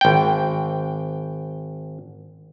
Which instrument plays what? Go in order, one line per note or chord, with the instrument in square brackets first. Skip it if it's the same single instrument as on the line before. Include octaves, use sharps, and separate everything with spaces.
[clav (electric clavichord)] G#1 G5